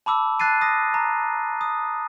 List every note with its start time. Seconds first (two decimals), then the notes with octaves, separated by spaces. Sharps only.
0.06 A5 B5 D6 E6
0.40 A5 F#6 A6 C7 D#7
0.61 D#6 A#6
0.94 A#5
1.61 D#6